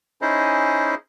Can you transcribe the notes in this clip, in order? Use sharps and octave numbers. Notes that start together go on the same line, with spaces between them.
C#4 D#4 E4 G#4 C5 D#5